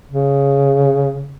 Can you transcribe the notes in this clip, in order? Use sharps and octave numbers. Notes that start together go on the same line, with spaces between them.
C#3